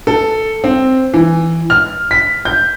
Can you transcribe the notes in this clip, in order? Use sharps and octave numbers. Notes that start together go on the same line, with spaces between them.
A4
C4
E3
F6
B6
G6